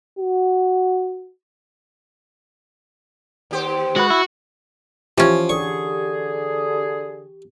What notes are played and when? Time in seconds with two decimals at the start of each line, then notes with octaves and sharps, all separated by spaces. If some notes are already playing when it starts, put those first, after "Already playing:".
0.19 F#4
3.51 D#2 G4 C5
3.96 G#3 F#4 B4
4.10 E4
5.18 E3 F3 C#4 G4
5.49 D3 G#4 C#6